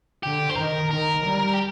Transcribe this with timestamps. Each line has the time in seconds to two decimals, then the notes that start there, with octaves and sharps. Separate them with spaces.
0.23 D3 G4
0.49 C5
0.56 D#3 A#4
0.91 D#3 A#4
1.24 G3
1.54 G4